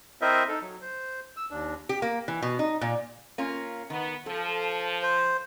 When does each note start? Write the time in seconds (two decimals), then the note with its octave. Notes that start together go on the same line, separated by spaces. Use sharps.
0.21 C4 E4 A#4 C5 D#5 E5
0.48 D#4 A4
0.62 F#3
0.81 C5
1.37 E6
1.51 D#2 D4
1.89 G4
2.02 A#3
2.28 E3
2.42 B2
2.59 D#4
2.81 A#2
3.38 A#3 C#4 F4
3.90 D#3 B3
4.26 F3 A4
5.02 C5